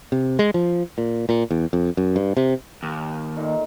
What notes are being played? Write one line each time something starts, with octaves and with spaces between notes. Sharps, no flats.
C3
G#3
F3
A#2
A#2
E2
F2
F#2
G2
C3
D#2
A#2 D#3 A3